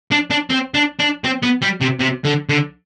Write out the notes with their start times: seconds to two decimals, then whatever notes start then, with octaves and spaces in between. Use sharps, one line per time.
0.12 D4
0.31 D4
0.50 C4
0.74 D4
0.99 D4
1.24 C4
1.43 B3
1.62 G3
1.81 C3
1.99 C3
2.25 D3
2.49 D3